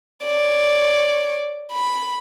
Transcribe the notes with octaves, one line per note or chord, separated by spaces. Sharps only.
C#5 D5
B5